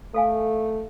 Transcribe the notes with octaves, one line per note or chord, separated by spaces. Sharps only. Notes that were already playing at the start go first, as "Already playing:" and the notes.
A3 A4 F5 G#5